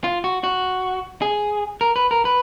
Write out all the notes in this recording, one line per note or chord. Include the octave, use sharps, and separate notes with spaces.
F4
F#4
F#4
G#4
A#4
B4
A#4
B4